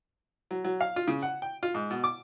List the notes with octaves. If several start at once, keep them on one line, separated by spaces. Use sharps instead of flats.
F#3
F#3
F5
F4
C#3
F#5
G5
F4
G#2
B2
D6